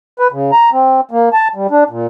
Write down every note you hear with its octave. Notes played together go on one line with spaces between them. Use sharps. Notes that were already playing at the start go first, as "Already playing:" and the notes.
B4
C#3
A#5
C4
A#3
A5
G3
D4
A#2